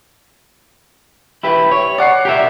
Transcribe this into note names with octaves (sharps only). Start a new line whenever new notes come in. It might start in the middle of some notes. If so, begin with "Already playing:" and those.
E4 G4 B4
C#5
D5 F#5 C7
G4 A#4 E5